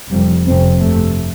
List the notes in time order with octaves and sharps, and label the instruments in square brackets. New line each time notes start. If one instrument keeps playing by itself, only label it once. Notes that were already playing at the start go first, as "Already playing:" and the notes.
[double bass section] F1 F2 C3 G3
F1 F2 C3 C4
G1 F2 C3 A3